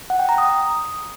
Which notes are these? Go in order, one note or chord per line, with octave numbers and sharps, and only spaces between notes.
F#5
G5
A#5
D#6